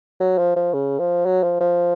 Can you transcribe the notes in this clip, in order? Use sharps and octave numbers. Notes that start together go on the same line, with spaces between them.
F#3
F3
F3
C#3
F3
F#3
F3
F3